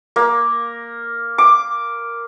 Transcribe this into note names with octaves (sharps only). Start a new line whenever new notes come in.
A#3
D6